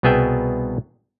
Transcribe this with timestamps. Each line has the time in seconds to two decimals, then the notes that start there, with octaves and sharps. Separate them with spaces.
0.03 C2 B2 B3 G#4 E5 G5